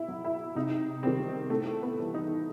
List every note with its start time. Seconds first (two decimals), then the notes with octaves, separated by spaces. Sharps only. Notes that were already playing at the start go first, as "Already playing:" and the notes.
Already playing: B2 E4
0.08 F#3
0.24 E4
0.55 C3 D#4
1.03 D#3 G3 C4
1.50 A2 A3
1.82 B3
1.99 E3 G3
2.14 D#4